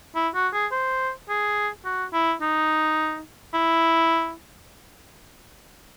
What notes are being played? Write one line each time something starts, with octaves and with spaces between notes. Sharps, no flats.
E4
F#4
G#4
C5
G#4
F#4
E4
D#4
E4